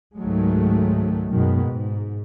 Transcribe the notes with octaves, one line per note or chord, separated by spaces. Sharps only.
C#2 G#2 D#3 F#3 G#3 A3
F#2 B2 D#3 G#3 B3
G#2